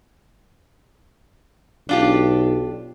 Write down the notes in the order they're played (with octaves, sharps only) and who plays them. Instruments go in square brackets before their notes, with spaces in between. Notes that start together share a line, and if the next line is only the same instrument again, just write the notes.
[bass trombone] B1 [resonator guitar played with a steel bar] D4 F4 G4